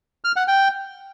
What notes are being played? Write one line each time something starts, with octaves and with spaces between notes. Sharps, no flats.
F6
F#5
G5